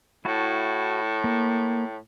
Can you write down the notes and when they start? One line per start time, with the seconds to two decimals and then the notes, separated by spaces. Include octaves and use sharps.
0.25 A2 E4 F#4 A5
1.24 A#3